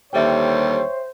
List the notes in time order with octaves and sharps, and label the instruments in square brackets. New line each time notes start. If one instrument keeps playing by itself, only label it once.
[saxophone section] D#2 D3 G3 [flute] C5 [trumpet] C#5 [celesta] E5 G5